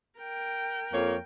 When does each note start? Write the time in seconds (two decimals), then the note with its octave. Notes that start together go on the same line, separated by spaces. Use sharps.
0.19 A#4 G5
0.92 F2 A#3 C#5